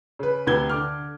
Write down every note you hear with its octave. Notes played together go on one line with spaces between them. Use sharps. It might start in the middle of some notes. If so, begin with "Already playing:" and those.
C#3 B4
D2 C3 B4 G#6 G7
D3 D6 F6